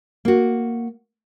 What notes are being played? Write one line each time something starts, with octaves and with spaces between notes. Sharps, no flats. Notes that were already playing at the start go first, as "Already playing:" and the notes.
A#3 F#4